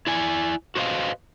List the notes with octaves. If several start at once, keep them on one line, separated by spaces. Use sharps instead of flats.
E4 D5 G#5
F#4 B4 C5 D#5 F5